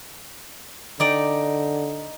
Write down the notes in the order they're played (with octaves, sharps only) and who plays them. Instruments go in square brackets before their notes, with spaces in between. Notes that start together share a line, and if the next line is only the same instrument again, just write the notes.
[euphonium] D3 [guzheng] D#4 D5 G5